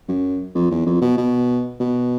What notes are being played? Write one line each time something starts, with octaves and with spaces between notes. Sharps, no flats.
F#2
F2
E2
F2
B2
B2
B2